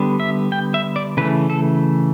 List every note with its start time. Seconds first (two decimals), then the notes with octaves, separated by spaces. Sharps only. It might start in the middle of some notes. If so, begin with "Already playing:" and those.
Already playing: D3 G3 B3
0.20 E5
0.52 G5
0.74 E5
0.96 D5
1.17 C#3 E3 A3 B4
1.50 A4